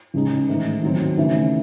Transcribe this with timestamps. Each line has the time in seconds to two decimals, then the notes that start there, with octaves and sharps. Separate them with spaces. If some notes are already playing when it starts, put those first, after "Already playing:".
0.14 C#2 C#3 G#3 D#4
0.48 A1 G#2 D#3 A3
0.83 D#2 D#3 F#3 C4
1.17 D#2 C#3 E3 A3